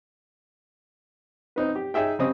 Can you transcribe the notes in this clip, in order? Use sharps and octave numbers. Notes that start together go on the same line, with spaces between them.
C4 D#4 B4
G4
D#4 G#4 E5 G5
C#3 G3 C4 D#5 D#6